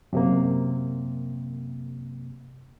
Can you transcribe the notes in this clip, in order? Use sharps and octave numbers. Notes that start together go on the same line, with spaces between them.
F#2 C3 A#3